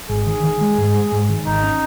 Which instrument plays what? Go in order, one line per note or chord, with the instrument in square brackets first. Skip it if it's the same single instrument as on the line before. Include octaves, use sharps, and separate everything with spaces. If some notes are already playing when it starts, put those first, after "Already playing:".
[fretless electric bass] G#1 [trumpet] G#4
[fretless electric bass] D#3
D#3
G#3
G#2
G#3
G#2
D#3
[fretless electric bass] G#1 [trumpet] D#4
[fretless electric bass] C#4